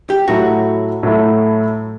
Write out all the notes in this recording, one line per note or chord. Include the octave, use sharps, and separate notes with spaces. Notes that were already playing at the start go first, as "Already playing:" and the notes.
G4
A2 F#3 A3 E4 F#4
A2 F#3 A3 E4